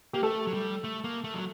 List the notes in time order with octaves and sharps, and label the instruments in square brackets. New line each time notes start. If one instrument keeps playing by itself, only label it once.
[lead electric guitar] A#3 [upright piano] G4
[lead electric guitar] A3 [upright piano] A4
[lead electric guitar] F#3
G3
A3
A#3
A3
F#3